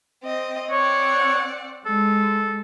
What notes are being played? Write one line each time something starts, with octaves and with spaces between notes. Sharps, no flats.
C4 D#5
C4 C#5 D5 F#5
G#3 A4